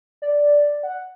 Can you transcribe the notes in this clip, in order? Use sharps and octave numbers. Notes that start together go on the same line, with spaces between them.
D5
F#5